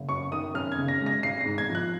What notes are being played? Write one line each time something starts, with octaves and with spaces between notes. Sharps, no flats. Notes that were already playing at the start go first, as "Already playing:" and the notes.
Already playing: F#1
F#2 C#6
D#3 D#6
F#2 F6
G#6
C#3
A#6
G#3
A#6
G#1 C7
A#6
G#2
G#6
F3
F#6